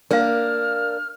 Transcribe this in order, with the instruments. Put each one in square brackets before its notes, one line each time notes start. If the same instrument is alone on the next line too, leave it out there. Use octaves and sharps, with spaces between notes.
[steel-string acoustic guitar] A#3 D4 [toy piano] A#4 F5 [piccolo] F6